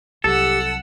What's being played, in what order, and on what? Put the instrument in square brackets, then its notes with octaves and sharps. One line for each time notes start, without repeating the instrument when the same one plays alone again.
[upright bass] C2 F#3 [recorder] G4 [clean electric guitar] A4 [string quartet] F#5 E6